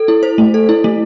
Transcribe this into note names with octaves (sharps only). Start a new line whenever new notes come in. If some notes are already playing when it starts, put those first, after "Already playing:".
Already playing: A4
E4
C5
A3
A4
E4
A3